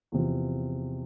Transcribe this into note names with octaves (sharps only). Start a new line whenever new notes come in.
E2 C3 F3